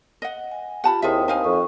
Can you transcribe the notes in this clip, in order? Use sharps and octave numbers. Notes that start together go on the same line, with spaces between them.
D#5 F#5
G#5
F4 G4 F#5 A5 B5
D#2 C4 E4 F4 G#4 E5 G5 D#6
D#4 A#4 F5 G#5 D#6
F2 C#6